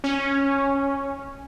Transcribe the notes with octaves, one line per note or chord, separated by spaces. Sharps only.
C#4